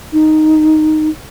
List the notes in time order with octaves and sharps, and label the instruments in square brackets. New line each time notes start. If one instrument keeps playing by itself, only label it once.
[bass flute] D#4